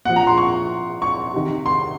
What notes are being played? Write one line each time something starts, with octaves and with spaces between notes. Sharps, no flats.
A#2 F3 F#5
A#5
C6
C#6
C#6
C3 D#3
C6